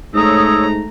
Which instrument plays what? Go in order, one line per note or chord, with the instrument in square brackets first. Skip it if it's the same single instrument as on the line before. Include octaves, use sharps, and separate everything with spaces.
[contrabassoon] G#2 [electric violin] A3 A#5 [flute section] C#5 D#6 E6